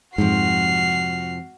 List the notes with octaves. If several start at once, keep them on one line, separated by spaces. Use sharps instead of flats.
F2 G#2 C3 F3 F#4 F6 C7